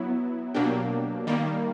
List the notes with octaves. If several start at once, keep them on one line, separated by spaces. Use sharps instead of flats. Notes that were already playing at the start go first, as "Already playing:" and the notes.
Already playing: F#3 B3 E4
B2 F#3 A#3 D4 G4
D#3 G3 A#3